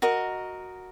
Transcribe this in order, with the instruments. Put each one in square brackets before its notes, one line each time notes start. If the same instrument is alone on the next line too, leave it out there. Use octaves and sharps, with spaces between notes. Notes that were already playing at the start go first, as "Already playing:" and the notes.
[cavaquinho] F#4 A#4 D#5